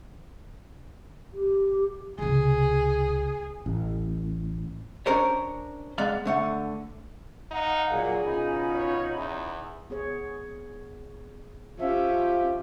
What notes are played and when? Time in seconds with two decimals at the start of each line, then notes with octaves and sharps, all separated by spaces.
1.34 G4
2.19 C#2 C3 G#4
3.66 A1
5.06 C#4 D4 A#4 C5 C#5
5.98 G#3 B3 D5 F5
6.25 D3 A3 F#5
7.51 D#4 F5 F#5
7.91 A#2 F#3 G#4
8.24 B2 C#4 D#4 F4 B5
8.74 C#5
9.15 E2
9.90 B3 G#4 C#5
11.79 F3 C#4 G4 E5